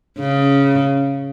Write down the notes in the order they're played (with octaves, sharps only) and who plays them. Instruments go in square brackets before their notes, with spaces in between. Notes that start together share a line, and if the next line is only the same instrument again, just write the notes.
[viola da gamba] C#3